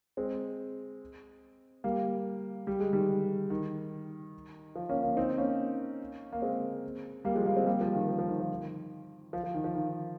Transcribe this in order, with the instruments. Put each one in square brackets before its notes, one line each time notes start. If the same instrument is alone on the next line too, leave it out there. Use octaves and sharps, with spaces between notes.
[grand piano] G#3 C4
G3 A#3
G3
G#3
D#3 G3
D#3
F3
A#3 C#4
A#3 C#4
C4 D#4
A#3 C#4
A#3
G#3 C4
G3 A#3
F3 G#3
G3 A#3
G#3 C4
G3 A#3
F3
D#3
F3
F3
D#3
F3
D#3
F3
F3
D#3
F3
D#3